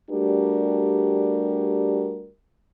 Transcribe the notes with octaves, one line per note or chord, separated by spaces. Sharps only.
G3 A3 D4 F#4 G4 A#4